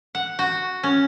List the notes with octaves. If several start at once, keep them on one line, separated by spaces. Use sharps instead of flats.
F#5
F#4
C#4